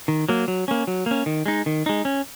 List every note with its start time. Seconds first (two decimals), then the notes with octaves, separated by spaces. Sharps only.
0.08 D#3
0.29 F#3 A#3
0.48 F#3
0.68 A#3 C#4
0.87 F#3
1.06 A#3 C#4
1.26 D#3
1.46 G#3 D#4
1.66 D#3
1.86 G#3 D#4
2.05 C#4